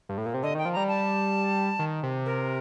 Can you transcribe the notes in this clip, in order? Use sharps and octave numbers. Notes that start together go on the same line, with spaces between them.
G2
A2
A#2
C3
D3 D#5
D#3 G5
F3
G3 A#5
A5
D#3
C3
A#4